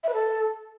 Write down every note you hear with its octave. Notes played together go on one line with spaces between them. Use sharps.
E5
B4
A4